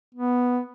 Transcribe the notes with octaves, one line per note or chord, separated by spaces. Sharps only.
B3